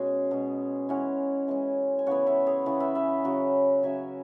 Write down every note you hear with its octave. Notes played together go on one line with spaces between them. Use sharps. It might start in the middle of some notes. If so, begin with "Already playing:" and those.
Already playing: B2 G#3 C#4 F#4 G#4
B2 G#3 C#4
E3 G#3 C#4 C#5 F#5
E3 G#3 C#4
G#5
C#3 E3 B3 C#5 F#5
B4 E5
G#4 C#5
C#3 E3 B3 C#5 F#5
B4 E5
B4 E5
C#3 F#3 C#4
C#3 F#3 C#4 E5 G#5